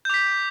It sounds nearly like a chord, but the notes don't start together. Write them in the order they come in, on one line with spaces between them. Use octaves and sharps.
G6 D6 B6